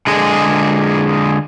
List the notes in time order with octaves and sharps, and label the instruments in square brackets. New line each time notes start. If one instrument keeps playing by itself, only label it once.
[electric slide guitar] D3 G#3 G#4